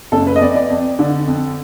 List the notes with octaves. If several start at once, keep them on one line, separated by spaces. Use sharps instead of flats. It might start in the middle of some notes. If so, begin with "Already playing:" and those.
F#1 A4
B4
D#5
F2 D5
D5
F2
D3
F2